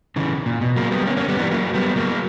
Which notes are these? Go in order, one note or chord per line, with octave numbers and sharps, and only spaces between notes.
C#3 E3
A#2
B2
F#3 A#3
G3 B3
A#3 C#4
A#3 C#4
G3 B3
E3 G3
F#3 A#3
G3 B3
F#3 A#3